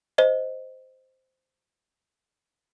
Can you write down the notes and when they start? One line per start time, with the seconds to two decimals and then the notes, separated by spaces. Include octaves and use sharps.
0.18 C5 D#5